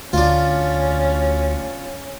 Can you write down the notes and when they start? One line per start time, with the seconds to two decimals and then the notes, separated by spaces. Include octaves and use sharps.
0.13 D2 C#4 D4 F4